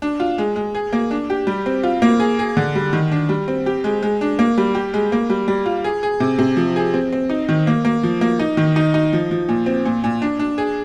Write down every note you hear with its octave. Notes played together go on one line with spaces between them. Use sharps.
D4
F4
G#3
G#3
G#4
A#3
D4
G4
G3
C4
F4
A#3
G#4
G#4
D3
G3
D#3
D4
G3
C4
G4
G#3
G#3
D4
A#3
G3
G4
G#3
A#3
G3
G3
F4
G#4
G#4
C3
C3
F3
G#4
C4
C4
D#4
D#3
A#3
A#3
F3
A#3
D#4
D#3
D#4
D#4
F3
F3
A#2
C4
A#2
A#2
D4
D4
G#4